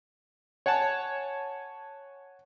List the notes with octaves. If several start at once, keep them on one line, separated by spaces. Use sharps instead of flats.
C#5 F#5 G#5 A5